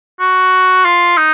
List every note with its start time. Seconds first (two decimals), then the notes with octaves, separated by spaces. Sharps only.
0.20 F#4
0.85 F4
1.17 D#4